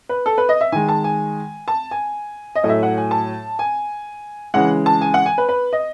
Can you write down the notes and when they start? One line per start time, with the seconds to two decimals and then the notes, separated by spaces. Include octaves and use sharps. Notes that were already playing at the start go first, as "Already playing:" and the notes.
0.09 B4
0.26 A4
0.38 B4
0.49 D#5
0.61 E5
0.72 D#3 G#3 G#5
0.89 A5
1.04 G#5
1.68 A5
1.91 G#5
2.55 D#5
2.63 A2 F#3 A3
2.69 E5
2.83 F#5
2.97 G#5
3.11 A5
3.59 G#5
4.54 C#3 E3 G#3 F#5
4.86 A5
5.01 G#5
5.14 F#5
5.26 G#5
5.38 B4
5.49 B4
5.73 D#5